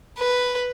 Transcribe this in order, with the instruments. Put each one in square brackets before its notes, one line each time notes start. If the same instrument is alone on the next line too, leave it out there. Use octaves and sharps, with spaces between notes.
[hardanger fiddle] B4